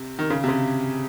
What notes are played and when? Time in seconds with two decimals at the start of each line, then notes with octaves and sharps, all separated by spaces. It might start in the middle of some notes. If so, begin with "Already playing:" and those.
Already playing: C3
0.19 D#3
0.30 C#3
0.44 C3
0.48 C#3